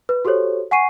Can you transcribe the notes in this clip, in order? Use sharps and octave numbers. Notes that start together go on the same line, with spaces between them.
B4
F#4 G4 A4 C5 C#5
F#5 G#5 C#6 C7 D#7